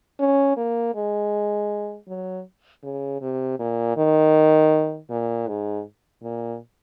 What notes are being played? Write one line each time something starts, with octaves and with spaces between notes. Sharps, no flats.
C#4
A#3
G#3
F#3
C#3
C3
A#2
D#3
A#2
G#2
A#2